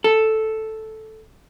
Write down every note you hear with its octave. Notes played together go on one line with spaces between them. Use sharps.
A4